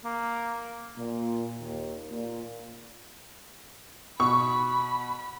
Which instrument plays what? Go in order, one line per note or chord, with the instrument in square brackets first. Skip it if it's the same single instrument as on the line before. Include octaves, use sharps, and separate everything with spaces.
[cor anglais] A#3
[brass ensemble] A#2
D#2
A#2
[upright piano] B2 [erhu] B5 [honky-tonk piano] C#6